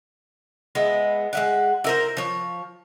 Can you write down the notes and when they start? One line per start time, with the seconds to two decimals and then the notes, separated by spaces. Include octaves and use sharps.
0.75 G#3 B3 E4
1.33 G#3 E5 F#5
1.84 E4 A#4 C5
2.17 F3 C#5